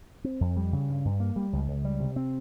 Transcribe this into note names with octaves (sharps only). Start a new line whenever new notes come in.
C4
F2
G3
C#3
G2
G2
A#3
G3
C#2
C#2
G3
C3
C4